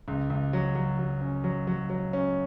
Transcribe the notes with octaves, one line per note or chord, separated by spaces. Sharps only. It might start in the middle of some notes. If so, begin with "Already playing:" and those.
C#2
C#2
F#3
F#3
F#3
C#4
F#3
F#3
F#3
C#4